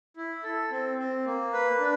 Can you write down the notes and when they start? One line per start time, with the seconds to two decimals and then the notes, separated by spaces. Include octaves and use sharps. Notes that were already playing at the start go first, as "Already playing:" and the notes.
0.17 E4
0.43 A4
0.71 C4
0.98 C4
1.25 A#3
1.53 B4
1.80 D4